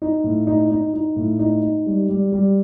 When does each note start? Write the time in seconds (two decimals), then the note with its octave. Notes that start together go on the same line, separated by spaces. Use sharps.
0.02 D#4
0.24 A2
0.47 D#4
0.70 D#4
0.94 D#4
1.16 A2
1.39 D#4
1.62 D#4
1.86 G3
2.09 G3
2.32 G3